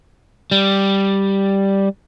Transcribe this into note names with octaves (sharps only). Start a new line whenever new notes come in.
G3